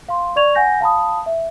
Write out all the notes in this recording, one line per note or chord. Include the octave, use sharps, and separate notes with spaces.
F5 C6
D5 C#6 G#6 F7
F#5 G#5 G6 A#6
F5 A5 B5 D#6
E5